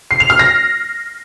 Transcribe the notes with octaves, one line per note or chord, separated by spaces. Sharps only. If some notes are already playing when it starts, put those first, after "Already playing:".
C7
F7
F6
A#6